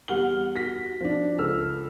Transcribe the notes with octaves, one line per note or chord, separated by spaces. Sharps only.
E2 G3 F#5 F6 G7
F#4 A#6 B6
F3 D4
C#2 A4 E6 F6